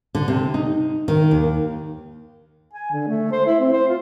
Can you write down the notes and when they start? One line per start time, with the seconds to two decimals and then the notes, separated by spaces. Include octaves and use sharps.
0.15 D3
0.28 C3
0.54 D#4
1.08 D#3
1.31 D#2
2.73 G#5
2.91 D3
3.07 A3
3.32 C5
3.46 E4
3.60 C4
3.72 C5
3.88 F4